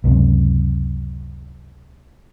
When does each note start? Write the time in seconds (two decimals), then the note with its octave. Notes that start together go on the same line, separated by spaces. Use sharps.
0.04 C#2 F#2 C3